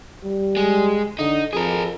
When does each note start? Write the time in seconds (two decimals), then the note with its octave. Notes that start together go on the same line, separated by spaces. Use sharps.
0.24 G3
0.57 G#3
1.19 D3 D#4
1.53 F2 G#4 A#4